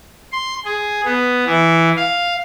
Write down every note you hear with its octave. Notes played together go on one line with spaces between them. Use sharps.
C6
G#4
B3
E3
F5